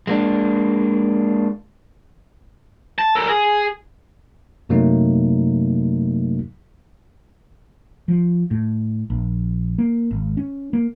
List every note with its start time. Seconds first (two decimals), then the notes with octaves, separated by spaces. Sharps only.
0.07 G#3 A#3 D4
2.98 A5
3.15 A4 A#4
3.29 G#4
4.69 F#2 C3 F#3 A3 A#3 D#4
8.08 F3
8.51 A2
9.10 A#1
9.78 A#3
10.11 G#1
10.37 C#4
10.73 A#3